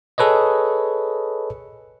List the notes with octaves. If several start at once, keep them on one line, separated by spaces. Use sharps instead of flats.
G#4 A4 B4 C#5 D#5